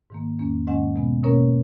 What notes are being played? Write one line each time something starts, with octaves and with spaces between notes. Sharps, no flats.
G#2 D#3 A#3
E2 D#3 A#3 C#4
G#2 D#3 G#3 C#4 D#5 F#5
B2 G#3 B3
B2 A#3 C#4 A#4 C#5